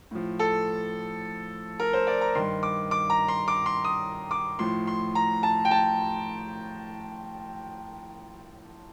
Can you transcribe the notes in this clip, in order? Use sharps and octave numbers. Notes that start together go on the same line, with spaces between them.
A2 F3
A4
A#4
C5
D5
A#5
G2 D#3 C6
D6
D6
A#5
C6
D6
C6
D#6
D6
A2 F3 C6
C6
A#5
A5
G5
A5